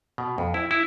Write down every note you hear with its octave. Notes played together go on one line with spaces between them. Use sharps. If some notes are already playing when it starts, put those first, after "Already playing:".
B2
F2
E4
E4